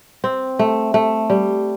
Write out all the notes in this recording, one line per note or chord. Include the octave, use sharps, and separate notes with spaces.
C4
A3
A3
G3